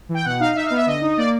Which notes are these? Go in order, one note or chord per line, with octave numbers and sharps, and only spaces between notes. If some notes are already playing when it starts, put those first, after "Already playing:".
E3
G5
B2 F#5
D#4 F5
D#4 E5
B3 F5
E5
D3 D#5
D#4
A#3 D5